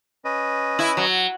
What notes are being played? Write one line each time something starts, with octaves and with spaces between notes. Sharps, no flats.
C#4 B4 D#5
E4
F#3